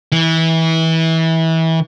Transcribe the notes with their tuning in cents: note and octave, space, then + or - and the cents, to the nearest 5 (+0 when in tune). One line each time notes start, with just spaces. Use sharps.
E3 -25